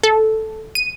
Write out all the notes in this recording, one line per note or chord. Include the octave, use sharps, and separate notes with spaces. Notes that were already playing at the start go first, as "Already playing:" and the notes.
A4
D#7